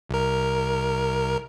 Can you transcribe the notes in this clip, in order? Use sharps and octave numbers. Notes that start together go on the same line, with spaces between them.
C2 A#4